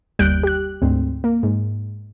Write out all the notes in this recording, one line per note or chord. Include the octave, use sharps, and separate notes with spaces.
G1 D#2 G3 F#6 G6 D7
G4 F#6
D2 G#2 C4
A#3
G#2